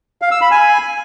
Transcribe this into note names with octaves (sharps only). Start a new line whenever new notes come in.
F5
E6
B5
G#5